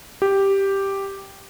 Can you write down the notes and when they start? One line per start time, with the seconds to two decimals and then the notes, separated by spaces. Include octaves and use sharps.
0.22 G4